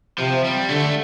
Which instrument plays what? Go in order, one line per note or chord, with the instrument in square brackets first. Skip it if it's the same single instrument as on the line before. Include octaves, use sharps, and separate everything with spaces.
[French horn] C3 [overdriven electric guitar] F3
[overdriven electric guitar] G3
[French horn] D3 [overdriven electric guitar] A3